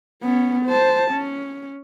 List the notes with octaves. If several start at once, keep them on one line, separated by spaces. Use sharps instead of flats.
B3 C#4
C5 A5
C#4